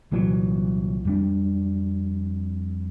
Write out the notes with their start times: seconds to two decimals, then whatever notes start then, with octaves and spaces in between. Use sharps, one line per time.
0.12 C2 A#2 E3 F#3
1.05 F2 G3 D4